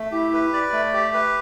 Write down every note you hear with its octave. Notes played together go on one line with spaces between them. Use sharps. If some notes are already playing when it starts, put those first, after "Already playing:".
Already playing: A3
E4 G4
B4
D5
A3
G4
B4